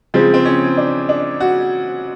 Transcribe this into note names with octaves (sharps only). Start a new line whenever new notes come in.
C#3 F3 G#3 C4
C4
C#4
D4
D4
F#4